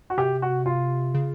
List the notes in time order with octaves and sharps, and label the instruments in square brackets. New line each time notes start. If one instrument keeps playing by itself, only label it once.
[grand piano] F#4
[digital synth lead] C3 [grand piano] G4
[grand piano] F#4
F4
[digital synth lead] C#3